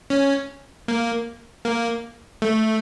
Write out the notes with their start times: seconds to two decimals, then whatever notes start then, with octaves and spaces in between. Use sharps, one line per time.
0.10 C#4
0.88 A#3
1.65 A#3
2.42 A3